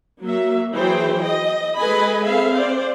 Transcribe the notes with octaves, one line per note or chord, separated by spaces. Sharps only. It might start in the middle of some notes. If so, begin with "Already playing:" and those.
F#3 A#3 E5
E3 F#3 G#4 C5 G5
D#5
G#3 A4 B4 D#5 G#5 B5
C4 G#4 A4 E5 F5
C5 D5